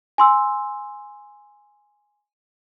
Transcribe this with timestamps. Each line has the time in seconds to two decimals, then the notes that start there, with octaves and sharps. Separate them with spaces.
0.18 G#5 C6 E6